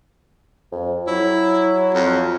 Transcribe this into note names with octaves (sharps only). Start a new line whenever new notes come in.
F2
F#3 E4
F2